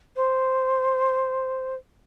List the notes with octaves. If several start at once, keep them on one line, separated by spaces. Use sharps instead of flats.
C5